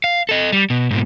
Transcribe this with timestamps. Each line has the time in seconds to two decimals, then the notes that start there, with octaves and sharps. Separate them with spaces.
0.04 F5
0.29 A4 D#5
0.52 G3
0.70 B2
0.91 G#2 B2